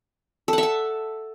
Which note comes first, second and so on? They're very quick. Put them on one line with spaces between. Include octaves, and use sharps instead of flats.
A4 F#5 E5 A5